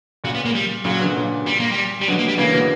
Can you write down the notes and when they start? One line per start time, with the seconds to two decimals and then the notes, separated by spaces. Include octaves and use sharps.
0.24 A#2 C#3 F#3
0.35 B3
0.45 A#3
0.55 G3
0.85 A#2 C#3 F#3
1.00 B2 D3
1.16 A#2 C#3
1.47 G3
1.60 A#3
1.72 G3
2.02 G3
2.08 B2 D3 F#3
2.19 A#3
2.28 G3
2.38 C#3 E3 A#3
2.53 B2 D3